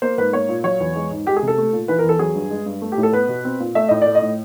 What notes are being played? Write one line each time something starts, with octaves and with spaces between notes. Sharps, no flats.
A#3 C5
G#2 B4
A#3 C#5
A#2
F#3 C#5
E2
G#3
G#2
G#3 G4
G#4
C3
A4
A3
A#2
E3 B4
A#4
E2
A4
F#3 G#4
G2
G#3
G2
A3
G4
A2
A4
B3 B4
B2
C4
A#2
A3 E5
A2 D#5
A3 D5
D#5
A2